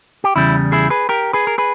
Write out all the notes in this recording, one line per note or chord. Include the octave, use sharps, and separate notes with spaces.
G4
E2 C#3 G3 E4
E4 G#4
G#4 B4
G4 A#4
G#4 B4
A#4
G#4 B4